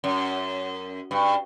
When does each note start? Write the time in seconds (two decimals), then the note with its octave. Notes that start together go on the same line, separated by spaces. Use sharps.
0.04 F#2
1.11 G2